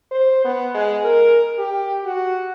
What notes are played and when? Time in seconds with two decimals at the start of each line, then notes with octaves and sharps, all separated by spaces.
0.11 C5
0.45 B3
0.75 G#3
1.05 A#4
1.59 G4
2.04 F#4